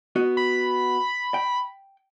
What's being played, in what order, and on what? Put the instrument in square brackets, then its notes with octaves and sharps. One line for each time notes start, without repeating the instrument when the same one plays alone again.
[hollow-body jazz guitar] B3 F#4 D#5
[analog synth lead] B5
[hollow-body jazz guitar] G5